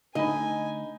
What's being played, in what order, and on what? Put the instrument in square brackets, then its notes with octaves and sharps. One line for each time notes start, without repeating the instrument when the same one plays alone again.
[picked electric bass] D3 A3 [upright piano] D#4 B5 [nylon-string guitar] D#5 [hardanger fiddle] G#5